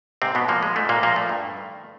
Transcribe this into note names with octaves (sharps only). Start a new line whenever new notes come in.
G#2 C3 C4
B2 B3
A#2 F3 A#3
G#3
G#2 A3
A#2 A#3
A#2 F3 A#3
A3
G2
D#3